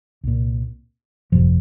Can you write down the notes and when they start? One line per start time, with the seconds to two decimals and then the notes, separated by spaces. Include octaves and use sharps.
0.24 C2 A#2
1.32 G1 F2 C3 F3